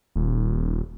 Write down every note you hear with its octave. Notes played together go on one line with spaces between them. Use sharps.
D#1